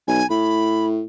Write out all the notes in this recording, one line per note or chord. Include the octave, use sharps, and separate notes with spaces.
B1 G#5
A2 B5